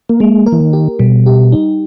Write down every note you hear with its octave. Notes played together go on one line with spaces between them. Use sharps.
A#3
G#3 A#3
A#4
E3
D#3
G4
B2 G3
G4
D#4